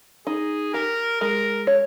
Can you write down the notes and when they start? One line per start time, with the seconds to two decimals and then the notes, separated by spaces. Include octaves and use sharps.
0.27 D#4 G#4
0.74 G4 A#4
1.21 G#3 A#4
1.67 C#5